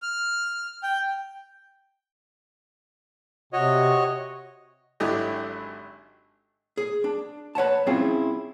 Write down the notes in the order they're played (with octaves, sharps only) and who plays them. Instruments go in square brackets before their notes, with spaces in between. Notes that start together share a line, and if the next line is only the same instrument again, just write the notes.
[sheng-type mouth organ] F6
G5
[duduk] C3 [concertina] F#4 C#5 D#5
[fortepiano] G#1 D3 F#3 E4 G4 D#5
[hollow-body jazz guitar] G#4
D4
B4 C#5 F#5 A5
C4 C#4 E4 F4 G#4